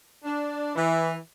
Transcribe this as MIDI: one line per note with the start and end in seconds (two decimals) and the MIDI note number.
0.24 0.73 62
0.75 1.15 52